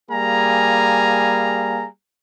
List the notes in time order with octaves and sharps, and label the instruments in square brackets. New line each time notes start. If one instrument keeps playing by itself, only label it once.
[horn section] G3 A#3 G#4 F5 G#5 A#5